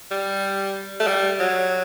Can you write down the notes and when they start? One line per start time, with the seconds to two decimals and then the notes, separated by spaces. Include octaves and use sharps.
0.11 G3
1.00 A3
1.07 G3
1.40 F#3